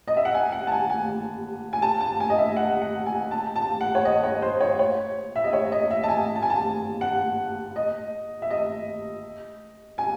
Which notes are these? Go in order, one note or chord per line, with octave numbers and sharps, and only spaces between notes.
D#5
E5
F#5
G#5
F#5
A5
G#5
G#5
G#5
A5
A5
G#5
D#5
E5
F#5
F#5
G#5
A5
A5
F#5
C#5
D#5
C#5
C5
C#5
C#5
E5
D#5
C#5
D#5
E5
A5
G#5
A5
G#5
A5
F#5
D#5
E5
D#5
G#5